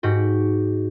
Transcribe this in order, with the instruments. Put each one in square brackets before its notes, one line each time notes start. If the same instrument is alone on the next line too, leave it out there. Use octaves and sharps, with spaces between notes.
[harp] G#2 F#4 G4